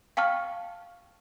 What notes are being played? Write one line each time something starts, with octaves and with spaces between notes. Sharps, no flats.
F5 G5 A5 C#6 F6